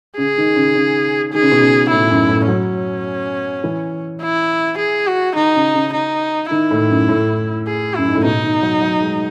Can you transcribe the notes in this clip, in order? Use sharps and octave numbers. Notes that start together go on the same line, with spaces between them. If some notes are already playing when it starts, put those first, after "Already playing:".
C#3 G#4
D#3
C#3
C#3
D#3 G#4
C#3
B2
C#3
A2 E4
F#2
A2
F#3 C#4
E3
E4
G#4
F#4
D#3 D#4
C#3
C#3
D#4
D#3 E4
A2
F#2
A2
G#4
F#2 E4
G#2
A2
B2 D#4
D#3
F#3
F#3
G#3